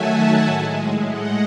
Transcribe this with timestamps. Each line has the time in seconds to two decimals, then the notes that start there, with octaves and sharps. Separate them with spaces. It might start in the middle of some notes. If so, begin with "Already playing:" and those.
Already playing: D#3 F#3 A3 E5 F#5 G#5 A5
0.45 A2 G#3
1.08 D#5 F#5